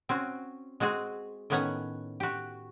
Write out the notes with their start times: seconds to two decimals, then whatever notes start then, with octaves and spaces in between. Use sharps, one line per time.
0.09 C4 C#4 F#4
0.80 G#3 C4 F#4 G#4
1.50 A2 D#3 B3 C#4 C#5 F#5
2.20 F#4 G4